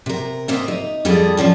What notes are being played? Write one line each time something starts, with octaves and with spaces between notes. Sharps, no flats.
C3 A#4
C3 A#3 C4 D#5 E5
D#4
F2 G3 G#4 A4 D#5
G#2 F3 C#4 D4